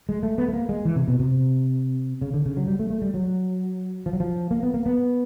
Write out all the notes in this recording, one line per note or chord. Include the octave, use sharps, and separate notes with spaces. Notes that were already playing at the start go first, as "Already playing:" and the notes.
G#3
A3
B3
A3
A#3
G#3
E3
C3
B2
C3
C#3
D3
C#3
F#3
G3
A3
A3
G3
F#3
F3
F#3
F3
A#3
B3
A#3
B3